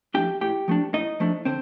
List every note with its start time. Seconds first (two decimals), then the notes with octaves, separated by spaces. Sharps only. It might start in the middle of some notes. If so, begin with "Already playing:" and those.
0.14 F3 A3 D4 G4 G5
0.41 A2 G4 G5
0.68 F3 A3 D4
0.93 A2 D#4 D#5
1.20 F3 A3 D4
1.45 D3 C4 C5